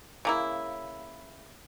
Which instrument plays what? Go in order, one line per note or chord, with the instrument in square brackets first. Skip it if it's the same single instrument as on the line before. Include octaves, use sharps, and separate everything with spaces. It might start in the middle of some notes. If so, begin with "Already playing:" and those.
[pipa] C#3 A#3 E4